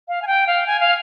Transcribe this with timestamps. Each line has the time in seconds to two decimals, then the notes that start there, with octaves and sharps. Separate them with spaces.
0.08 F5
0.22 G#5
0.27 G5
0.47 F5
0.67 G#5
0.80 F5